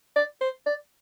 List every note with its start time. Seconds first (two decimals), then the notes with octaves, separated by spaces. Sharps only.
0.16 D5
0.41 C5
0.66 D5